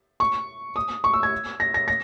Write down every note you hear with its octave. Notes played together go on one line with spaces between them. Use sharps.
C#6
D#6
C#6
E6
G#6
A#6
A#6
A#6